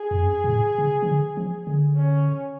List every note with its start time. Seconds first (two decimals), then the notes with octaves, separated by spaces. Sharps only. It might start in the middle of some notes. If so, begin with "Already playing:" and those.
Already playing: G#4
0.11 F2
0.20 F#2
0.44 B2
0.49 A2
0.78 C#3
1.02 F3
1.08 D3
1.37 F3
1.67 D3
1.96 C#4